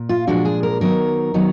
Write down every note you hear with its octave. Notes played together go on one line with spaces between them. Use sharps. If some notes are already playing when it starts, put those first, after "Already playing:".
Already playing: A#2
F4
A#2 F3 G#3 D4 F#4
G#4
A#4
D#3 F#3 B3 D#4 A#4
D#3 F#3 B3 D#4